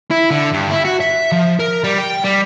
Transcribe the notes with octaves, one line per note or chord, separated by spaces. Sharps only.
E4
D3
G2
E4
F#4
E5
F3
A#4
G3
G5
G3